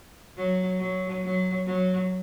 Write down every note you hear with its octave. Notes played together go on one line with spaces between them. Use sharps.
F#3
F#3
F#3
F#3